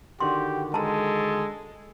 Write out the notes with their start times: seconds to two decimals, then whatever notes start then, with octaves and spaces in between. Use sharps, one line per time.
0.20 D3 D#3 F#4 G4 C6
0.74 G#3 A4 A5 A#5